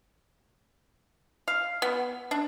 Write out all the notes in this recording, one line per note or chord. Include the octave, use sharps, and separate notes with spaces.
F5
B3
D4